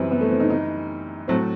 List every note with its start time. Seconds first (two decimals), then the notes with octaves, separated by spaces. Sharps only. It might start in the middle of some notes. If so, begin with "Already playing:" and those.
Already playing: F#2 E3 G3 C4
0.11 B3
0.21 A3
0.31 C4
0.40 D#4
0.50 D#4
1.28 A2 F#3 A3 C4